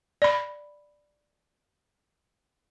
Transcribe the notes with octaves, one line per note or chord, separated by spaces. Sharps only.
D5 B5